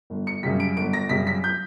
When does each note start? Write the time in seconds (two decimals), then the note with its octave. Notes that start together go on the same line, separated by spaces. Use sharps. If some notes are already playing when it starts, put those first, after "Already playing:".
0.10 G1
0.27 C#7
0.43 F#2 C#3 G3 B6
0.60 D7
0.77 G1 D7
0.93 A#6
1.09 F#2 C#3 G3 B6
1.27 B6
1.44 G6